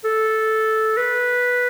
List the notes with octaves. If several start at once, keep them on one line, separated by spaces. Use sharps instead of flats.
A4
B4